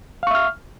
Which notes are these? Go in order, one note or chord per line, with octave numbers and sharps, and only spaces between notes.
E5 F5 C#6 F6